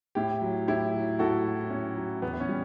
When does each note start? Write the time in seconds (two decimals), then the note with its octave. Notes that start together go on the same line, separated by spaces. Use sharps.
0.15 A2 E4 G4
0.42 F#3
0.68 A2 E4 G4
0.94 F#3
1.19 A2 F#4 A4
1.45 F#3
1.70 A2 C#4
1.96 F#3
2.22 E2 B3
2.34 B3
2.40 C#4
2.49 G3